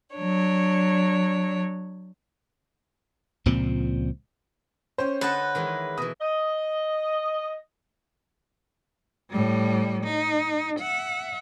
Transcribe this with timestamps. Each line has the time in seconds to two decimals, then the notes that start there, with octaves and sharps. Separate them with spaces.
0.15 F#3 D4 C#5
3.46 C#2 A#2 F3 C4
4.98 C#4 C5 C#5 G5
5.21 D3 B4 D#5 F#5 A5
5.55 D#3 E3 G#3
5.98 B2 E3 D#6
6.21 D#5
9.30 A2 G3
10.04 D#4
10.80 E5 F#5